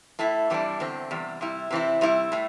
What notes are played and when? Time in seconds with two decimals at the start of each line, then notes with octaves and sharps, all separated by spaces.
0.19 A2 A3 E4
0.50 C3 E3 G3 D4
0.80 E2 D3 C4
1.11 E2 C3 G3
1.41 C3 G3 E4
1.71 C3 E3 C4 E4
2.01 C3 G3 E4
2.32 A2 A3